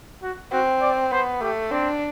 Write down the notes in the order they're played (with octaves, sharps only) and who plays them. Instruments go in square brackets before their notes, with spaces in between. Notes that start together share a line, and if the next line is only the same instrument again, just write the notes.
[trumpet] F#4
[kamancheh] C4 [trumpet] F#4
[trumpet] D5
[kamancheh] B3 [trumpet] C5
[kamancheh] A3 [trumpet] G4
[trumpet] C4 [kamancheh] D4